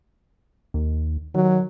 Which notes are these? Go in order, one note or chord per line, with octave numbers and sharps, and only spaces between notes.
D#2
D#3 F#3